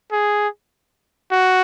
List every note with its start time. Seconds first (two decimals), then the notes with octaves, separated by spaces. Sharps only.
0.12 G#4
1.31 F#4